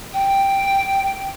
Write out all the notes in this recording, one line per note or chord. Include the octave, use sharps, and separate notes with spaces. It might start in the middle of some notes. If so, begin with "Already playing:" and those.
G5